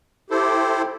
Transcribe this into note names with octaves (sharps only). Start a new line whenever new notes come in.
E4 G4 A4 C5